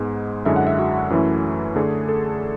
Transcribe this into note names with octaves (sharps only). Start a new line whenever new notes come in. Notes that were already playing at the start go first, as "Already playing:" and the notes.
Already playing: G#2 G#3 B3
F#2 D3 G#3 C#4 E4 E5
F#5
E5
F#4
F#2 E3 A3 C#4 E4
D3 A3 D4 G#4
A4